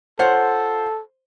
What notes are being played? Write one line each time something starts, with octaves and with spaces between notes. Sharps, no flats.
F4 A4 C5 C#5 F#5